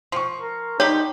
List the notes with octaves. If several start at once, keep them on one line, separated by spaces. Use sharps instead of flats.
F3 C6 C#6
A#4
D3 G3 D#4 G4 C#5